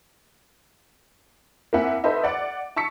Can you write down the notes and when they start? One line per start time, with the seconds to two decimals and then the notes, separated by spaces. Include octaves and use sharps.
1.73 A#3 C4 E4 E5 F#5 G#5
2.04 D#4 A4 B4 C5 D#5 E5
2.24 D5 F#5 D6
2.76 A5 C#6 E6 B6 C#7